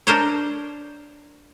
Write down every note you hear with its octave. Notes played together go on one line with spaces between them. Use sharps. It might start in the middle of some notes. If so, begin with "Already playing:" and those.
D4 A#4 C5 C#5